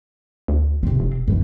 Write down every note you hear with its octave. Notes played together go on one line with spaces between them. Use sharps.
D2
C3 C4
F1
F#2 E3